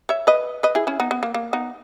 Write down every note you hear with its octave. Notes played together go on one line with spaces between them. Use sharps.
C#5 E5
B4 D#5
B4 D#5
E4 G#4
C#4 E4
B3 D#4
B3
A#3
A#3
B3 D#4